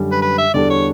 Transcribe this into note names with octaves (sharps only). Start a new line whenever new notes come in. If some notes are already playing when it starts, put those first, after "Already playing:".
Already playing: F#2 D3 G3
B4
B4
E5
E2 D3 G3 D4 A4 D5
C#5